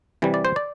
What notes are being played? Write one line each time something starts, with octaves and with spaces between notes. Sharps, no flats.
C3 E3 G3
D5
C5
D5